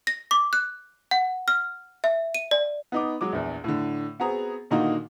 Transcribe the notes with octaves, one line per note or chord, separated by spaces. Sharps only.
A#6
D6
F#6
F#5
F6
E5
D#7
D5
B3 D#4 D6
F#3 G#3 D6
A#1 E2
A2 D3
B3 C4 F#4 G#4 A#5
A#2 D3 D#3 A#3 D#4 F#4